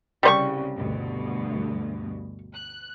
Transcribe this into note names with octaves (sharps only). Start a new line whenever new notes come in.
C2 C#3 G3 C5 C#6
D2 G2 B2
F#6